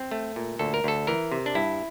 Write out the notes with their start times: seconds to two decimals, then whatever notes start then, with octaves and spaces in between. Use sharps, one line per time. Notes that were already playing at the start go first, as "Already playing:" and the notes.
Already playing: C4
0.11 A3
0.36 A#2
0.59 D2 A4
0.74 A#4
0.84 D2 A4
1.07 E3 A#4
1.32 C3
1.46 D4
1.55 G2 E4